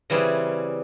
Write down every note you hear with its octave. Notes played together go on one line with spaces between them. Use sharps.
C#3 E3 G3 C4 C#4 G#4